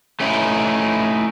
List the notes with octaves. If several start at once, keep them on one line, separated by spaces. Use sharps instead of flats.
A3 C#4 D#4 E4